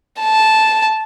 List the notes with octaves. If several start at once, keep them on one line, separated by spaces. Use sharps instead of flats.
A5